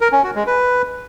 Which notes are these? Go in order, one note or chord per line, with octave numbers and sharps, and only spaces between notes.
A#4
C#4
F#4
G#3
B4